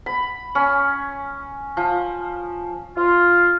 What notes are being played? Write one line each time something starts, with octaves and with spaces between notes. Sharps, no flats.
B5
C#4
F3
F4